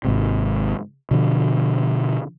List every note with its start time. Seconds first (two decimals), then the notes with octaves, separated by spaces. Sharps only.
0.05 G#1 G#2 C3
1.11 B2 D3 F3